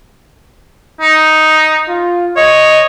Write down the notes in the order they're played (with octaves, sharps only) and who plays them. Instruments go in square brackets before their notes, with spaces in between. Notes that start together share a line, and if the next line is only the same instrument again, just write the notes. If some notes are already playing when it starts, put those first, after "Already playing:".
[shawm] D#4
[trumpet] F4
[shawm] C#5 [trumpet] D#5